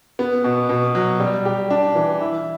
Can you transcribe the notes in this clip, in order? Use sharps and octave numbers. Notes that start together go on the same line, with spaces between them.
B3
B2
B2
F#3
G3
G4
D4
E3
E4